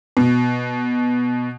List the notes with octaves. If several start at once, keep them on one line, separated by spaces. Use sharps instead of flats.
B2